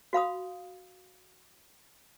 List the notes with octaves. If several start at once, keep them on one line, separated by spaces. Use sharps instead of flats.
F#4 F5 B5 D#6